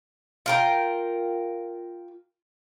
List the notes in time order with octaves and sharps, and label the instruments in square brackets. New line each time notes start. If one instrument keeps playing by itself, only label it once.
[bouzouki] F4 A#4 G5